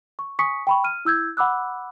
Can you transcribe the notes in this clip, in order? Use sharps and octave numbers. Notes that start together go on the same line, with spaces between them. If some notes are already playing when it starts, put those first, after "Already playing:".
C#6
G#5 C#6 D#6 B6 C#7
G5 B5 C#6
F6 D#7
E4 E6 G6 G#6
F#5 B5 D6 E6 F#6